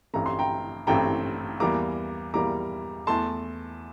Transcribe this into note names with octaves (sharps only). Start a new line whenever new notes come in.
A1 G2 E3 A3 C4 A#5
C6
G5 A#5
A1 G2 E3 A3 C4 G5 A#5
E2 E3 G3 A#3 A#5 D6
E2 E3 G3 A#3 A#5 D6
E2 E3 A3 A5 C6